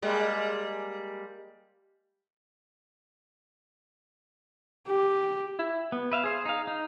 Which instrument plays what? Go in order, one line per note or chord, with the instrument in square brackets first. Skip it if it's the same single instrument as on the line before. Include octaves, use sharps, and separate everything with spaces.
[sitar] G3 G#3 A#3
[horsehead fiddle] G4
[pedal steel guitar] E4
B3
B4 E5 F5
G#4 C5
D#4 F5
D#4